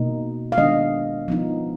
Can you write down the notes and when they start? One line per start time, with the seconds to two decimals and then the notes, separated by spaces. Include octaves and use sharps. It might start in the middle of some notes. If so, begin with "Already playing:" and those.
Already playing: B2 A#3 D#4
0.52 F5
0.57 D#3 G#3 B3 D4 D#5
1.28 F3 B3 D#4